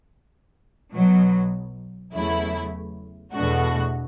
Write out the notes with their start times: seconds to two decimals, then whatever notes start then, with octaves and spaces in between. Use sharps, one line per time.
0.93 B1 B2 F#3
2.14 E2 C#3 F#3 A3 E4
3.34 E2 B2 A3 D4 F#4